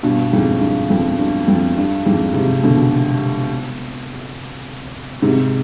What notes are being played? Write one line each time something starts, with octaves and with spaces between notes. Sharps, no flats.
G2 B2
F2 G#2
G2
F2
G2
F2
G2
F2 G#2
G#2 C3
B2 D3
G#2 C3